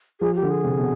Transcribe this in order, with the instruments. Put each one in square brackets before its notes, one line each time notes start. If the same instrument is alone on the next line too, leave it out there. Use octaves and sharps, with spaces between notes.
[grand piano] F3 [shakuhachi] G#4
[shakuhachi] G4
[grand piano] D3
[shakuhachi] G#4
[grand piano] C3
B2